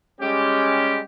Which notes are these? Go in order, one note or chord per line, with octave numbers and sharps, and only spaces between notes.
G3 G#3 C#4 G4